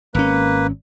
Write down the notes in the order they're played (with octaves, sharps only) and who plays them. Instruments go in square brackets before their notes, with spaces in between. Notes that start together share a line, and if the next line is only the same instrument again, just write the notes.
[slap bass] G#1 C#4 [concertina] A#3 B4